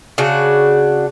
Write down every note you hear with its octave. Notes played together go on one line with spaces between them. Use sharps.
C#3 D4 F#4